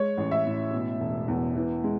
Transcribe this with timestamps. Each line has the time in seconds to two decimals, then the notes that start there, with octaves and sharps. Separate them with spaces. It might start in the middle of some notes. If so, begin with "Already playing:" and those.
Already playing: G#3 C#5
0.17 A1
0.31 E5
0.46 A2
0.73 B2
1.00 E1
1.28 E2
1.55 E3
1.84 G#3